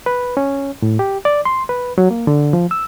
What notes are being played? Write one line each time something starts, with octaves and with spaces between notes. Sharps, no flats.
B4
C#4
A2
G4
D5
C6
B4
F#3
A#3
D3
F3
E6